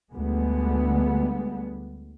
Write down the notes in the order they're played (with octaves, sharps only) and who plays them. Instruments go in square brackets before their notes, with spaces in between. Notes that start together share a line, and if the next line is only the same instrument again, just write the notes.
[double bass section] D2 G3 G#3 B3